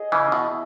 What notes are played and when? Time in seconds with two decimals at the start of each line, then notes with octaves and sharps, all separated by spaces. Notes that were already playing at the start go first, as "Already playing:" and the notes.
Already playing: G#4 D#5
0.12 C#3 E3
0.32 B2 E4